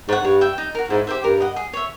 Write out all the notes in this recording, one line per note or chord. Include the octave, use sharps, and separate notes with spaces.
G#2 C#5 F#5
G2 C#5
E5 G5
D#4
F#4 A#4
G#2 E4
G4 C5 E5
G2 A#4
D#5 F#5
G#4
C#5 E5